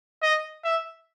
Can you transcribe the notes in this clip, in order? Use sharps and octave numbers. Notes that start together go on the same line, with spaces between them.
D#5
E5